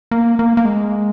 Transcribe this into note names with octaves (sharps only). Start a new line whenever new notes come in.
A#3
A#3
A#3
G#3